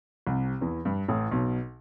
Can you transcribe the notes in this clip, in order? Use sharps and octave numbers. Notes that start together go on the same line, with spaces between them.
C2 C3
E2 E3
G2
A1 A2
B1 B2